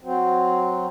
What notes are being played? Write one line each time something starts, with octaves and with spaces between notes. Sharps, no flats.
F#3 C4